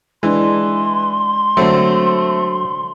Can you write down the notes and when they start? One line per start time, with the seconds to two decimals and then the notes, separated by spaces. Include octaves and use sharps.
0.23 E3 G#3 D4 C6
1.57 D3 F#3 A3 C4